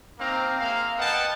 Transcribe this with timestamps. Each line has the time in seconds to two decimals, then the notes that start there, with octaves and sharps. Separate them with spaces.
0.19 A#3 C4 D#4 F5 A#5
0.59 G#3 A#3 E5 F5
0.99 B4 D#5 F#5 G5 A5